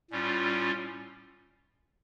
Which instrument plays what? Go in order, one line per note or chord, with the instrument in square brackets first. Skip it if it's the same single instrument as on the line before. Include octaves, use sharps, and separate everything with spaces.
[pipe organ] A2 G3 C#4 F4